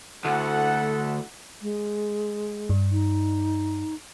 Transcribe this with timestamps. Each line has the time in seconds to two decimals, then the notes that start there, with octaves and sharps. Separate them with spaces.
0.25 D2 E4 A4 F#5
1.62 G#3
2.69 G2
2.92 D#4